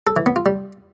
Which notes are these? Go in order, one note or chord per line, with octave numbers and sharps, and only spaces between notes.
A4
E3
B3
F4
G3